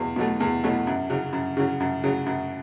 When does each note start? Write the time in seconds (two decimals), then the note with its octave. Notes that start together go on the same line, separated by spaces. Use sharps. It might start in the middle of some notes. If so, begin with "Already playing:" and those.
Already playing: E2 B2 F#3
0.16 B2 F#3 A3
0.40 E2
0.64 B2 F#3 A3
0.87 F#2
1.10 C#3 F#3
1.33 F#2
1.57 C#3 F#3
1.80 F#2
2.04 C#3 F#3
2.26 F#2